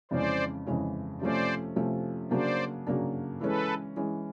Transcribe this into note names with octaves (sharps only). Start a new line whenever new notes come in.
F2 C#3 E3 G#3 C#4 C5 D5
F2 C#3 E3 G#3 C#4
C3 F3 A3 C#4 C5 D5
C3 F3 A3 C#4
C#3 F#3 A#3 D4 C5 D5
C#3 F#3 A#3 D4
E3 G#3 C#4 A4 B4
E3 G#3 C#4